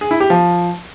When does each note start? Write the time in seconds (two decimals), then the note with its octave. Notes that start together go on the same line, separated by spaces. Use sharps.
0.01 G#4
0.11 E4
0.20 G4
0.30 F3